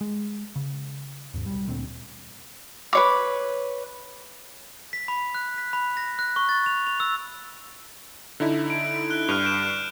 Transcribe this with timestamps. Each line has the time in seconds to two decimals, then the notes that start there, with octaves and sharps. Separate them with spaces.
0.01 G#3
0.56 C#3
1.34 D#2 G#2
1.46 B1 G3
1.68 D2 A#2 D3 C4
2.93 B4 C#5 D6
4.93 B6
5.08 B5
5.35 F#6
5.58 B6
5.73 B5
5.97 A#6
6.19 F#6
6.36 C#6
6.49 A6
6.66 F7
6.87 F7
7.00 E6
8.40 D3 D#4 E4
8.70 D7
9.10 F#6 G7
9.29 G2 F6 D#7 F7
9.42 G6 D7 E7